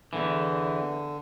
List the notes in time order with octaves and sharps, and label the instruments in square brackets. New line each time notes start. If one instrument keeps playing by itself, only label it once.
[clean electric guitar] E2 G#2 E3 [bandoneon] D3